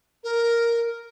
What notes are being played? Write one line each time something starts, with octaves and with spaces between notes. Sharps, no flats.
A#4